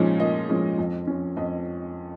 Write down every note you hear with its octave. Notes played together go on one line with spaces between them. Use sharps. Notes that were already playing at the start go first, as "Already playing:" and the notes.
Already playing: A#2 F3 G#3 C#4 D#4
A#2 D#5
F3 G#3 C#4
F2
F3 C#4
F2 D#5